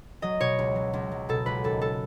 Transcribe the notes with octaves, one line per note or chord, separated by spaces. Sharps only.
F#3 D#5
B2 C#5
C#2
F#3
C#2
F#3
B2 A4
C#2 B4
D#2 A4
A4